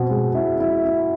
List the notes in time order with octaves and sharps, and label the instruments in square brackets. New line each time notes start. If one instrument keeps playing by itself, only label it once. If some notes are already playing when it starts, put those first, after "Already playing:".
Already playing: [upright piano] B2 C4
G#3
E4
E4
E4